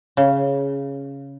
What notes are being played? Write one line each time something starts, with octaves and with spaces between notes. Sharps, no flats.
C#3